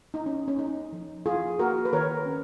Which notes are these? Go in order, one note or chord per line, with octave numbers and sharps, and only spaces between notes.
D#4
C#4
C#4
C#4 D#4
F3
F3 F4 G#4
A#3 F#4 A#4
B4
D#3 A#4 C#5
C#4